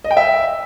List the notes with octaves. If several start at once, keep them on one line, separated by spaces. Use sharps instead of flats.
D#5
G5
E5